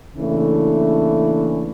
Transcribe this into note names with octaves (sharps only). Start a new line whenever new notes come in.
C#3 E3 A3 A#3 D4